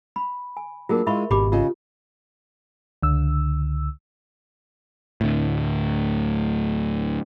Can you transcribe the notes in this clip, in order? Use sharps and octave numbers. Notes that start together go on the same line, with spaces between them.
B5
G#5
F#3 A#3 D4 F4 G#4 A#4
G#3 E4 F4 E5 B5 C#6
G#1 B2 G4 B5 D6
C#3 F4 D#5
C#2 D3 E6
D2 A2